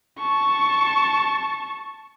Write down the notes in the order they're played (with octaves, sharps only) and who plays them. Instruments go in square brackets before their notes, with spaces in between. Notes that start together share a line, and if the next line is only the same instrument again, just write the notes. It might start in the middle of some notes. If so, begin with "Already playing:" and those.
[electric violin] A5 C#6